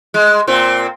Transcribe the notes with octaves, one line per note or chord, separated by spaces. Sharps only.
G#3
A#2 C4